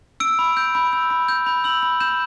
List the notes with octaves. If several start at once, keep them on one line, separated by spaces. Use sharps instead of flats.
E6 D7
B5
G6
B5
E6
B5
G6
B5
E6 F#7
B5
G6 E7